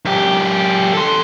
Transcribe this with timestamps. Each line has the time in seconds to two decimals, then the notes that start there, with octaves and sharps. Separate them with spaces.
0.05 F#2 G4
0.94 A4 C6